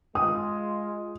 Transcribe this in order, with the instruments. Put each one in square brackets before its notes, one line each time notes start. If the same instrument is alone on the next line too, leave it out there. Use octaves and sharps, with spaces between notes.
[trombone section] G#3 F4 [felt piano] D#6